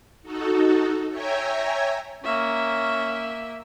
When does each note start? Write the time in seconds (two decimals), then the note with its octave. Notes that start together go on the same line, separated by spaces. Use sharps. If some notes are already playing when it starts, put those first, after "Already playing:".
0.22 D#4 F#4 A4
1.09 C#5 E5 G5 G#5 A#5
2.24 A#3 C#4 E5